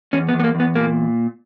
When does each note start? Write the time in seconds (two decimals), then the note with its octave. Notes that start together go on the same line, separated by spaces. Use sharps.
0.13 E2 C#4
0.29 B3
0.34 E2
0.40 B3
0.44 A#3
0.55 E2
0.60 B3
0.75 A#2 A#3